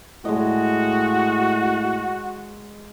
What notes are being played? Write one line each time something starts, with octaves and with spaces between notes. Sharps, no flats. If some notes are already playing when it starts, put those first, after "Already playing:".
A2 G#3 F#4 D#5